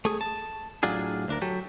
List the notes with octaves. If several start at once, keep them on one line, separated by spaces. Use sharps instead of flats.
A3 G#4
A5
A2 F#3 D4 F4 G#4
D2 D4 A#4
F#3 G4 A4